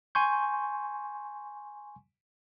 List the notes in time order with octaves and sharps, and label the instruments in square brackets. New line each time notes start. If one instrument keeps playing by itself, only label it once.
[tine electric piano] G#5 C6 C#6 G6